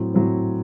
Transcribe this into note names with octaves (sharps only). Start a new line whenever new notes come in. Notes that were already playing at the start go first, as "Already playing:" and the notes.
Already playing: A2 F#3 C4
A2 F#3 C4